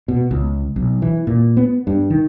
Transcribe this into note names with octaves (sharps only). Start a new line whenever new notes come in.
B2
C#2
B1
E3
A#2
B3
G2
D#3